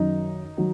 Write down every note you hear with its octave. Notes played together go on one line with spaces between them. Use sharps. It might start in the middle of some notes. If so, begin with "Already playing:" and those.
Already playing: F#2 D#3 F#3 D#4
D#3 F#3